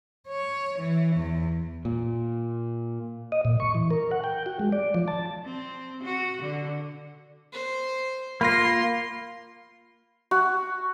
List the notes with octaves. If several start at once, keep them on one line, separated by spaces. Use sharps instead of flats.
C#5
E3
E2
A#2
D#5
A#2
C#6
E3
A#4
F#5
G5
F#4
G#3
D5
F3
A5
C4
F#4
D3
C5
A#3 F4 B5 C6 A#6
F#4